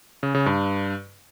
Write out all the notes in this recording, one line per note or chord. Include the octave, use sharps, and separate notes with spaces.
C#3
C#3
G2